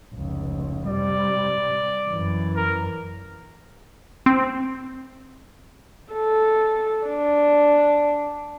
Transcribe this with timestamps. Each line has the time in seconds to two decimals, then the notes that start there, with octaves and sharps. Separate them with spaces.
0.14 F1 C#2
0.86 C3 G3 D5
2.07 F#2 E3
2.56 A#4
4.26 C4
6.13 A4
7.06 D4